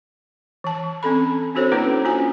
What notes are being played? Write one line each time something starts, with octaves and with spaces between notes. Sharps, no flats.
E3 A5
C4 C#4 A4 B5
C4 D4 F#4 A4 C5 C#5
A#3 C#4 E4 B4
C#4 D4 F4 F#4 G#5